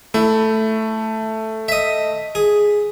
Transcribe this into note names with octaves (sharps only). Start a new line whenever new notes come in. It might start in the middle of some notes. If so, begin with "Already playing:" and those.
A3 E4
D#5 E5
G#4